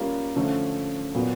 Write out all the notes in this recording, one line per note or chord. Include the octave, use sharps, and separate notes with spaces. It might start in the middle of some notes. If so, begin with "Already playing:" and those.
Already playing: G3 A#3 C#4 F4
D3 F3 A3 C#4
A#2 F#3 B3